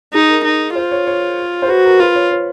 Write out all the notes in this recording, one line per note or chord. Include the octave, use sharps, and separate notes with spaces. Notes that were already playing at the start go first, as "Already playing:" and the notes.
D#4 G#4
A#4
D#4
F4 C5
C#5
C#5
C5
F#4 B4
A#4
F4 B4
C#5
C#5